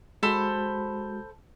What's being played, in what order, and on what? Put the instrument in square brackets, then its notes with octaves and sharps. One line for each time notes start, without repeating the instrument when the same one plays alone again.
[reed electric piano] G#3 F#4 [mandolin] A4 C5 B5